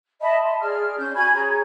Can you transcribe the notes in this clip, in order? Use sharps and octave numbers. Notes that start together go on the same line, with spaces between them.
D#5 E5 A5 B5
A5 C6
G#4 D5 F6
C#4 G6
F#4 G#5 B5 G#6
G#4 C#5 A#5